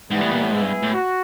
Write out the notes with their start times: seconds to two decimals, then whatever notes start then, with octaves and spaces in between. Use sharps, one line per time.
0.11 G#2 E3 G3 B3
0.21 A2
0.31 A#2
0.42 A2
0.51 G#2 G#3 B3 E4 G#4
0.62 G2
0.83 A2
0.93 F#4